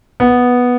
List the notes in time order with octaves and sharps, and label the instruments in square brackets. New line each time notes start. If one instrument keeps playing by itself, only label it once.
[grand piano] B3